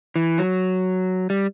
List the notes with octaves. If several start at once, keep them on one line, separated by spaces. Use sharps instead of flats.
E3
F#3
G3